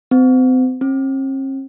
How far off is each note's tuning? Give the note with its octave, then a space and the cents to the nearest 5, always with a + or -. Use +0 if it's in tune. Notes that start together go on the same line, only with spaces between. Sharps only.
C4 -35
C4 +45